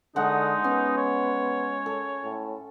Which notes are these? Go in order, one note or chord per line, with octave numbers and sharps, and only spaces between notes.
D3 G#3 D#4 F#5 C#6
B3 C#4
C#5
A4
A2